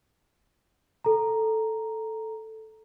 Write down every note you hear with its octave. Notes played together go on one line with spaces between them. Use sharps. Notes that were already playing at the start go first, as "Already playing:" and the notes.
A4 A#5